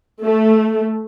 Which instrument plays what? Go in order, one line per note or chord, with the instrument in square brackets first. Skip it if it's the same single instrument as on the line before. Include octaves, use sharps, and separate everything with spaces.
[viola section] A3